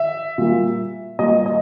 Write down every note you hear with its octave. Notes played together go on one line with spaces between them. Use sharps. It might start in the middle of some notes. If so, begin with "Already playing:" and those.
Already playing: E5
A#2 G3 A#3
A#2 G3 A#3 D#5
D#5